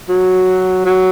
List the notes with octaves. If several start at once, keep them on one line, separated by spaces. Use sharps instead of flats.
F#3
F#3